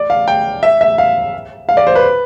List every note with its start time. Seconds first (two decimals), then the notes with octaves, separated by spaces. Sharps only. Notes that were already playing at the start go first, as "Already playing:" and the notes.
Already playing: D5
0.10 F5
0.28 G5
0.63 E5
0.81 E5
0.98 F5
1.69 F5
1.77 D5
1.87 C5
1.95 B4